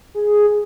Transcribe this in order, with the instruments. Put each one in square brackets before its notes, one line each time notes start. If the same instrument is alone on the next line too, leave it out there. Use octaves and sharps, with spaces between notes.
[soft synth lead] G#4